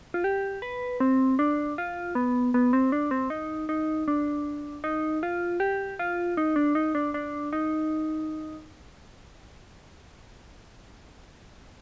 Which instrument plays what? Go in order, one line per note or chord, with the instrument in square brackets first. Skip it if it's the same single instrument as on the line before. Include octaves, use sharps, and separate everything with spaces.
[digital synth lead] F4
G4
B4
C4
D4
F4
B3
B3
C4
D4
C4
D#4
D#4
D4
D#4
F4
G4
F4
D#4
D4
D#4
D4
D4
D#4